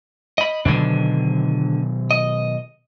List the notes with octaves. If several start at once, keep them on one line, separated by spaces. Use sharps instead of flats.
D#5 B5
B2 D3 D#3 F#3 D4
D#5